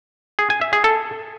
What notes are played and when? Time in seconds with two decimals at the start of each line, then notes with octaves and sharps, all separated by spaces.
0.39 G#4
0.50 G#5
0.61 E5
0.73 G#4
0.84 A4